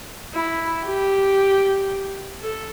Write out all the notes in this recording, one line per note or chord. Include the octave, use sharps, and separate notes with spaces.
E4
G4
A4